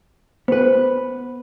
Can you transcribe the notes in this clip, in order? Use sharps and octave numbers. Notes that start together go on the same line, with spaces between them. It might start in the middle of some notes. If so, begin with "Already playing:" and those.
B3 B4 C5